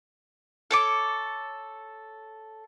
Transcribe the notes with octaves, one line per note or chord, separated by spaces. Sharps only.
A4 C#5 D6